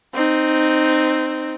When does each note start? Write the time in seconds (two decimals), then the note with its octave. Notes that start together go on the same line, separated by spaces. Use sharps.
0.14 C4 D#4